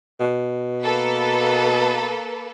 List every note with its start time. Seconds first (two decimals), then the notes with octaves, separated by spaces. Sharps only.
0.20 B2
0.83 A#3 A4 B4